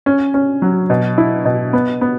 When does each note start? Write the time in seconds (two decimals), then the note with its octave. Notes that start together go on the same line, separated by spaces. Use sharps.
0.06 C#4
0.34 C#4
0.62 F#3
0.90 B2
1.18 E4
1.45 B2
1.73 B3
2.01 B3